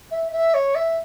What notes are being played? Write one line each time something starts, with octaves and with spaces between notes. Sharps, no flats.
E5
E5
C#5
E5